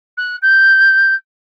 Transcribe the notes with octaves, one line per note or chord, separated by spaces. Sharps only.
F#6
G6